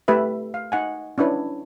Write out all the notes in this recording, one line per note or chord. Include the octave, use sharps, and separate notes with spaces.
A3 G4 B4 E5
F5
D#4 F#5 G#5
C#4 D4 E4 B4 C#5